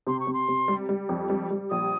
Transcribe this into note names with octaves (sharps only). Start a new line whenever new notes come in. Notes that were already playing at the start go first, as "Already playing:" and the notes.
C3 C6
C#6
C3
C6
C3
G3
G3
F2
G3
G3
A#1 D#6